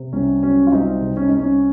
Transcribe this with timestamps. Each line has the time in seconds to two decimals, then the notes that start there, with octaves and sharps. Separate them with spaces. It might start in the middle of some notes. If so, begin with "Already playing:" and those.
Already playing: C3
0.13 C2 C#4
0.43 F#3 C#4
0.67 F4
0.72 C2 C4 D#4
1.01 C3
1.17 C#4
1.28 C2 D#4
1.39 C#4